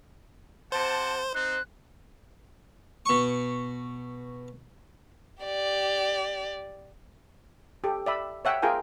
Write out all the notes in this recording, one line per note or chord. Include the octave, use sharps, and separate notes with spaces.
C3 C5 F#5 A5
C4 D#4 C5 F#6
B2 C#6
G4 D5
G4 A4
D5 E5 B5
C#5 E5 F#5 G5
F4 G#4 A#4 G5 G#5